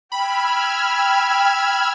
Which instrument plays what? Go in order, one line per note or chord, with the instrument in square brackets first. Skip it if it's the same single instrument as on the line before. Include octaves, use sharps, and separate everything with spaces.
[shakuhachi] G5 [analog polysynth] B5 [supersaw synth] E6 F6 G#6